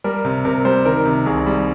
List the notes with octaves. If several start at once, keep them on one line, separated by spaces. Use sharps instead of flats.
G3 A#4
C3
C3 A#4
G3 C5
D#3 A#4
C3
C2 G#4
G3